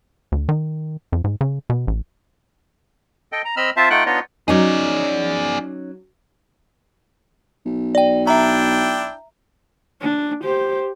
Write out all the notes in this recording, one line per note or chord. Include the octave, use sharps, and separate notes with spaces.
D2
D#3
F2
G#2
C#3
B2
A1
A4 D#5 G5
A#5
C4 D#5 B5 E6 F6
C4 F4 C5 E5 A5
A3 D#4 F4 F#5 G5 F#6
B3 D4 D#4 F4 C#5 D#5
F#3 C#4 D#4 G#4 D5
B1
D5 G5
D4 E4 E5 G5 A#5
D4
G4 C5